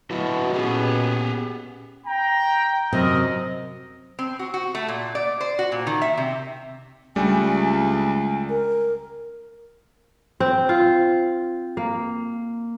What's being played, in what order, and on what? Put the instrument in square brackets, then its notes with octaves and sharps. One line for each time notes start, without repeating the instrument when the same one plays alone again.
[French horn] B2 [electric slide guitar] F#3 E4 F#4
[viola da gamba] A#2 B3 C#4 [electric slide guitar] G4 G#4
[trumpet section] G5 A#5
[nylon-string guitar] F#2 C3 F#3 [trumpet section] A#4 D#5
[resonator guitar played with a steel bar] C4
F#4
F#4
A3
A#2
D5
C5
F#4
A#2
D#3
E5
C3
[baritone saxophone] C#2 [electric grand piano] G3 A3 D4 [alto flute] G#5
[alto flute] A#4
[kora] C4
F4
A#3